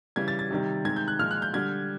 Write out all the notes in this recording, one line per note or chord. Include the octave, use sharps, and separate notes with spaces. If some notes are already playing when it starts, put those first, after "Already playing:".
C#3 E3 G3 G#6
A6
A6
C3 D#3 G3
C3 D#3 G#3 G#6
G6
F#6
A#2 F3 G#3 F6
F#6
G6
D3 G3 G#6